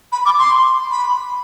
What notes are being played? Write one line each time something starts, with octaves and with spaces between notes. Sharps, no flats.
B5
D6
C6
B5